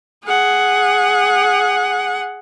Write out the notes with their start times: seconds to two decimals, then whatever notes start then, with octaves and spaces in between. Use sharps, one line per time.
0.25 G#4 F#5